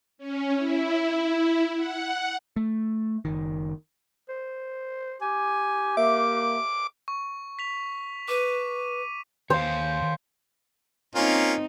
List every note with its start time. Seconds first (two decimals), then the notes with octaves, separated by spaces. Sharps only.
0.18 C#4
0.55 E4
1.75 F#5
2.56 A3
3.25 F#1 C2 D#3
4.29 C5
5.21 G4 G#5
5.97 A#3 E5 D6
7.08 C#6
7.59 B6 F7
8.28 B4 D6 D#7
9.50 D#2 C5 C#5 F5
11.15 A#3 C4 C#4 D#4 F4